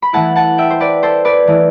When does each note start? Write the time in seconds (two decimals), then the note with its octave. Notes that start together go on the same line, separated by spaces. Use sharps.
0.02 B5
0.13 E3 A3 E4 F#5 A5
0.35 F#5 A5
0.58 E5 G5
0.70 C5
0.80 B4 D5
1.03 A4 C5
1.25 B4 D5
1.47 E3 A3 E4